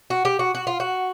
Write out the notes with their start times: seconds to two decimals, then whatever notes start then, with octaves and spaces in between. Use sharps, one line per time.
0.10 F#4
0.25 G4
0.39 F#4
0.55 F#4
0.67 F4
0.80 F#4